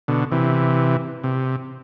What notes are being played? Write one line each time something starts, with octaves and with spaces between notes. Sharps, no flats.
B2 D3
C3 E3
C3